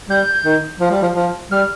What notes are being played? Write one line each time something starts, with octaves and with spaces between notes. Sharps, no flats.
G3 G6
D#3
F3
G3
F3
F3
G3 F6